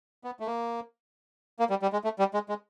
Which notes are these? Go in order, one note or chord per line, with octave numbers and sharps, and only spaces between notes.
B3
A3
A#3
A#3
G3
G3
G#3
A3
G3
G#3
G#3